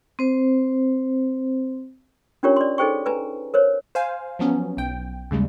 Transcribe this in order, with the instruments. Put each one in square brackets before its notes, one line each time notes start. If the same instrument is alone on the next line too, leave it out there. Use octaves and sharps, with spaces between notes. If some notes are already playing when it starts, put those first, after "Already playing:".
[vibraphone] C4 C5
[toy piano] C#4 D4 F4 G4 A#4 C#5
D5 C6
D#4 G#4 A4 C5 G5 C#6
B4 G#5 A#5
A#4 C5 C#5
[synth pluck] C5 F5 G#5
F3 F#3 B3 C#4
B1 G5
D#2 C#3 G3 G#3